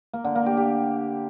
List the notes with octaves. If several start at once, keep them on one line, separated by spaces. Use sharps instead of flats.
A#3
D3
A#3
G4
G4